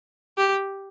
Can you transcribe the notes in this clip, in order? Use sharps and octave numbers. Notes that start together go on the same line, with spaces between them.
G4